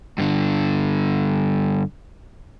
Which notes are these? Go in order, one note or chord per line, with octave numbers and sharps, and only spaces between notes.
G2 D3